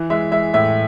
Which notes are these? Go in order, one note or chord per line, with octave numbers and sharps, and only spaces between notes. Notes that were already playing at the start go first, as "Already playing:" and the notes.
Already playing: E3
G#3 E5
G#3 E5
A2 E5